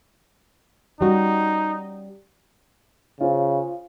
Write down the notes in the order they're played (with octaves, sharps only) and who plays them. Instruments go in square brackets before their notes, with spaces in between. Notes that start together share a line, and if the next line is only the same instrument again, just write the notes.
[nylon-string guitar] G3 C#4 F#4 [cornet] D#4
[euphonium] C#3 [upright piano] F4 C5